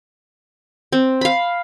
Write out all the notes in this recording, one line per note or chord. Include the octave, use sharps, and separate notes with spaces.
C4
F5 B5